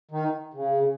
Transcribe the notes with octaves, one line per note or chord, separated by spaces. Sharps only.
D#3
C#3